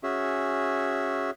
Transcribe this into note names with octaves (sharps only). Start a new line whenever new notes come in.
C#4 F#4 G#4 E5